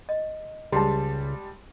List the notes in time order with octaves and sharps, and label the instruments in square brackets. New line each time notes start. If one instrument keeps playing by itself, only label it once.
[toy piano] D#5
[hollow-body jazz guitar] C#2 [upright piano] G3 G#3 [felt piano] A5 C6